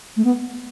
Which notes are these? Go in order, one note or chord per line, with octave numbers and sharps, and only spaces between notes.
A3
B3